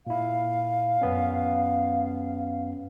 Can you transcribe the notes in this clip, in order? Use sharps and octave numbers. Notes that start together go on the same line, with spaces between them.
A#2 E4 F5
F#2 B3 C#4